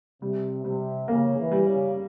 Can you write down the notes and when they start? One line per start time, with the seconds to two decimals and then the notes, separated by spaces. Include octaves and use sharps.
0.21 C3 G3
0.65 C3 G3
1.08 C#3 A#3
1.38 E3
1.51 G3
1.66 C#3